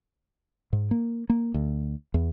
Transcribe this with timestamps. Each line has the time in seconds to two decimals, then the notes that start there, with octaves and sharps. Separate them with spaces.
0.73 G#2
0.91 A#3
1.30 A#3
1.54 D2
2.14 E2